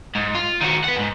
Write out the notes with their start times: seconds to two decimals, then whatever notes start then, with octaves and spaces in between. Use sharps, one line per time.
0.15 G#2
0.35 F4
0.61 D#3 F#4
0.84 B4 F#5
0.96 F2 G#2